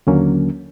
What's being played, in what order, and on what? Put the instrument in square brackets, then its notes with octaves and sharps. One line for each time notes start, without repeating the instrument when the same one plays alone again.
[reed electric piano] D#2 D3 F#3 A#3 C#4